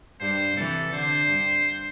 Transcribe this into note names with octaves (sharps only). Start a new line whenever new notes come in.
G2 C5
C3 E3 A4
D3 C5
G2